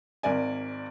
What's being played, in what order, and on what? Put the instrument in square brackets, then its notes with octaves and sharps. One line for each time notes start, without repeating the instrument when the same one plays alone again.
[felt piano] G#1 A#4 D5 G#5